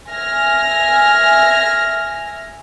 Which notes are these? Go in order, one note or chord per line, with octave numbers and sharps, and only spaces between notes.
E5 G#5 F6 A#6